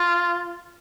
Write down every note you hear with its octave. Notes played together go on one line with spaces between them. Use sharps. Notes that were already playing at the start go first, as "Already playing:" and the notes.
Already playing: F4